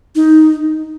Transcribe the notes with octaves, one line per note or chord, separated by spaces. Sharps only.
D#4